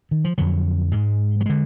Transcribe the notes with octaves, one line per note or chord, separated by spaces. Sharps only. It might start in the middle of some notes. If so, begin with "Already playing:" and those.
D#3
F3
F2 D3 F#3
G#2 G#3
F#3
D3 G#3